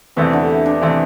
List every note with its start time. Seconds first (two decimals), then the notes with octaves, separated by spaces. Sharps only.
0.16 E2 C3 E3 G3 A3
0.33 D3
0.50 E3
0.66 D4
0.82 C3 E3 A3 C4